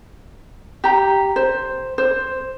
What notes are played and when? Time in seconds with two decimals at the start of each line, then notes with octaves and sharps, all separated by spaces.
0.84 G4 A#5
1.36 C5
1.98 C5